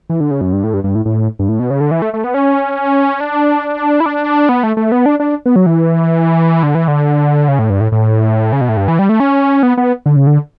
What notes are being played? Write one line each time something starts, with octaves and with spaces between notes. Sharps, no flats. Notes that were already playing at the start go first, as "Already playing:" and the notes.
E3
D3
C#3
F#2
G2
A2
G2
G2
A2
A2
G2
A2
B2
C#3
D3
E3
A3
A3
B3
C#4
D4
E4
D4
B3
A3
A3
B3
D4
D4
B3
F#3
E3
D3
E3
D3
C#3
A2
G2
A2
A2
C#3
B2
A2
G2
E3
G3
A3
C#4
B3
B3
D3
C#3
D3